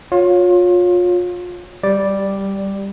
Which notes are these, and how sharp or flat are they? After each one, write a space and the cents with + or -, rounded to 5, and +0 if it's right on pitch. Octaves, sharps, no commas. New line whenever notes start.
F4 +30 C#5 +0
G3 +0 D5 +0